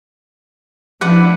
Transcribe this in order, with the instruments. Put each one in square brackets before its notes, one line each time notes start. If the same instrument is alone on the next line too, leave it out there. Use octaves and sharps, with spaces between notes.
[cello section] F3 D4 E4 [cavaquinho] B4 D5 F#5